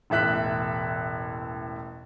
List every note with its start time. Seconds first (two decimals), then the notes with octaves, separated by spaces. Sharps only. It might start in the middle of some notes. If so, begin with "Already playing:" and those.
0.10 E1 A1 E5 F#6 B6